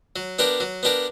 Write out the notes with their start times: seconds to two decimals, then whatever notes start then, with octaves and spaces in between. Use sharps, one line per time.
0.16 F#3
0.39 B3 D4 G4 A#4
0.60 F#3
0.83 B3 D4 G4 A#4